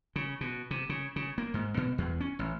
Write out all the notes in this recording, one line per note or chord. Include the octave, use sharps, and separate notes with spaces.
C#3
B2
C3
C#3
C#3
A#3
G#2
B2
E2
C#4
A1